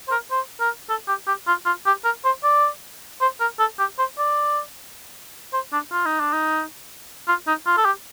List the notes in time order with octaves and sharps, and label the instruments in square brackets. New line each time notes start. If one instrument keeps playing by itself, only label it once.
[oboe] C5
A#4
C5
A#4
A4
G4
G4
F4
F4
G4
A#4
C5
D5
C5
A#4
A4
G4
C5
D5
C5
D4
F4
D#4
D4
D#4
F4
D#4
F4
A4
G4